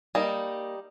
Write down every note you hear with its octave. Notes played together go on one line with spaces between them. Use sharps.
G3 A#3 D#4